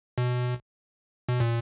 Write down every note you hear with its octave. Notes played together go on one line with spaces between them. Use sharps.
B2
B2
A#2